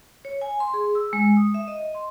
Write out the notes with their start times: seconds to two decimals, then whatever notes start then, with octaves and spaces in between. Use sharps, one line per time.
0.25 C#5
0.42 G#5
0.60 C6
0.74 G#4
0.95 E6
1.13 G#3
1.37 D#6
1.54 E5
1.68 D#5
1.95 C6